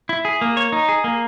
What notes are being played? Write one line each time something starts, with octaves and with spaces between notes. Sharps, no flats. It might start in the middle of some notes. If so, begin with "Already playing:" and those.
E4
G#4
A#3
C#5
D#4
G#4
A#3